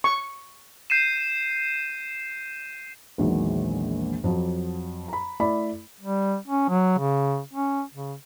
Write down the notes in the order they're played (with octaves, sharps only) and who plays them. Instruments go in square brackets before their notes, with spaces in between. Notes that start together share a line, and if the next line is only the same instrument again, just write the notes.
[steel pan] C#6
[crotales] G6 C7 D#7 E7
[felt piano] A#1 E2 A#2 D#3 F#3 G#3
F2 F3 F#3
A#5 B5
A3 E4 D5 B5
[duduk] G3
C#4
F#3
C#3
C#4
C#3